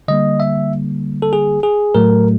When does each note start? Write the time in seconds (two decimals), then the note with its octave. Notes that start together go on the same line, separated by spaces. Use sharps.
0.08 D3 G3 A#3 D#5
0.40 E5
1.22 A4
1.33 G#4
1.63 G#4
1.95 A2 F#3 A3 A#4